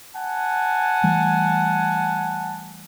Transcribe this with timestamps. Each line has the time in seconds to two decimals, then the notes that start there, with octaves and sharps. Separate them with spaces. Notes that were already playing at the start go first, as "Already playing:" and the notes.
0.16 F#5 G#5 A5
1.04 E3 G3 A3